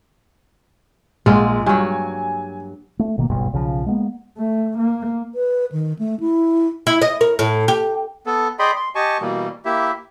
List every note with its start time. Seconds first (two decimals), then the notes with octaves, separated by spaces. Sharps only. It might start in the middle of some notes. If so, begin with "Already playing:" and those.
1.26 A#1 G#3 A#3 F4 F#5
1.66 G2 F#3 G#5
2.99 A3
3.18 A1 B2 D#3 A#3
3.30 F#1 B1 G2 B2
3.53 B1 C#3 E3 F3
3.86 G#3 A#3 B3
4.38 A3
4.78 A#3
5.34 B4
5.72 D#3
5.99 A3
6.20 E4
6.87 E4
7.02 D#5
7.21 A#4
7.39 A2
7.68 G4
8.26 B3 A4
8.59 G#4 D5 D#5 G5 B5 C6
8.76 C6
8.95 G4 D#5 G#5 A5 C#6
9.21 B2 E3 G3 A#3
9.65 A#3 E4 G4 E5